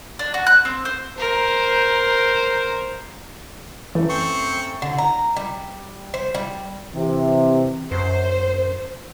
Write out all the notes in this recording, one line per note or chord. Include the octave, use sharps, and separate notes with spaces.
D4
F#4
F#6
C4
C5
A#4 C5
F#2 E3 A3
C4 C#6
D3
A#5
G3
C5
G3
C3 E3
F#2 C5